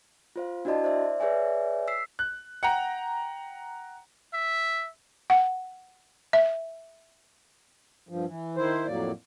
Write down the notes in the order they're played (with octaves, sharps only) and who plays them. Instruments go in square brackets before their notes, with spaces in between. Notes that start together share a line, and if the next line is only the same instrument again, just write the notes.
[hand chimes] F4 C5 F5
D4 E4 F#4 D5 D#5 A5
C5 D5 E5
G#4 B4 C#5 D5 E5 G#5
E6 B6 C7
[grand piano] F#6
F#5 G5 A#5
[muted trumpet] E5
[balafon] F#5
E5
[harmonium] G2 F3
E3
D#3 E4 C5
F2 A2 F#3 A#3 D5